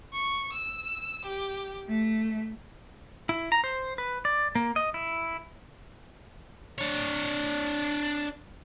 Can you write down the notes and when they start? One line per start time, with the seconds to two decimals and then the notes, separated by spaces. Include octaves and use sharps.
0.13 C#6
0.53 E6
1.26 G4
1.88 A3
3.29 E4
3.52 A#5
3.64 C5
3.98 B4
4.25 D5
4.55 A#3
4.76 D#5
4.94 E4
6.78 D4 C#5